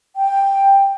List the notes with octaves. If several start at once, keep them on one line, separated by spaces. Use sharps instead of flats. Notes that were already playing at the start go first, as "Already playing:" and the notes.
G5